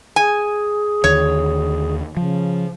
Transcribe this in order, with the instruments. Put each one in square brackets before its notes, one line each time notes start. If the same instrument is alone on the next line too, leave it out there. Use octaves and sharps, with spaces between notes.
[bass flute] G#4 [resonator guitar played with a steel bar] G#5
[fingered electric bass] D#2 D3 [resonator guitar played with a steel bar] C#5
[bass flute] C#3 [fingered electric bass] F3